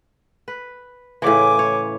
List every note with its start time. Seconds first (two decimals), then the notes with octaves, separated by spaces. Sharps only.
0.48 B4
1.22 A2 C#3 E3 G#5 D6
1.59 C#5